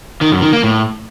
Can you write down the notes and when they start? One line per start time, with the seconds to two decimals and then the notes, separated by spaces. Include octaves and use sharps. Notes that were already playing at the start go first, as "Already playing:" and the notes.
0.21 D#3
0.32 F#2
0.42 D#3
0.53 A#3
0.63 A2